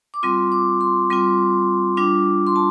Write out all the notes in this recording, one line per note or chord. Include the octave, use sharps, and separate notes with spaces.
D6
G3 C4 F4 C6
D6
C6
G3 C4 F4 C6
G3 D4 F4 D6
C6
A5